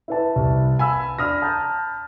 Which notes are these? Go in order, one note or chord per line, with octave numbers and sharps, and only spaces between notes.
E4 B4 A5
C2
G#5 B5 E6
D4 B5 D#6 F6 A#6
A5 A#5 G6